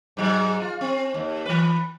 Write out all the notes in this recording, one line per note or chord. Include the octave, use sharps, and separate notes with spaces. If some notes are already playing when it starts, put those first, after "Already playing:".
G#2 F#3
F4
C4
D#2
E3 B4